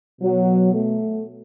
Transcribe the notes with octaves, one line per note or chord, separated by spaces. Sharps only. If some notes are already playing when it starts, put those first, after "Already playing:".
B2 F#3
A3